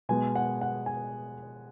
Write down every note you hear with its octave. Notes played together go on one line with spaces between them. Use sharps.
B2 G#3 G#5
F#5
F#5
G#5